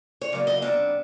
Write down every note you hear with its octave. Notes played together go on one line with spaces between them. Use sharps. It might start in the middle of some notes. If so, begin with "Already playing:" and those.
C#5
E2 C#3 F#3 A#3 D5
D#5
C3 D#3 G3 B3 D4 E5